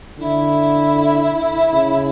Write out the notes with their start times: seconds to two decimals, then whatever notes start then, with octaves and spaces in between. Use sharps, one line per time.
0.19 D3 E4
1.73 C#3